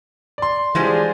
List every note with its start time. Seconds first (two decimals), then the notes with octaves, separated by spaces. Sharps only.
0.38 D5 C6
0.75 E3 G3 G#3 D4 F4 G#4 C5